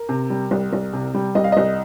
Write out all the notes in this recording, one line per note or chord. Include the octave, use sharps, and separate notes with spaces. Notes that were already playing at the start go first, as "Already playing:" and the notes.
Already playing: A#4
C3
G3
C2
C2
C3
G3
C2 D#5
F5
C2 D#5